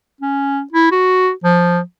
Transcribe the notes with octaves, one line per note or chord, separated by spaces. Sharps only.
C#4
E4
F#4
F3